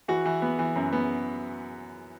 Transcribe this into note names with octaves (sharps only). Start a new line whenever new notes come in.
E3 F#4
E3
B3
E3
F#2
B3